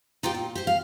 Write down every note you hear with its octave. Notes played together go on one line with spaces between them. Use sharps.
D#4 F4 G4 G5
A#2
G4 C5
F5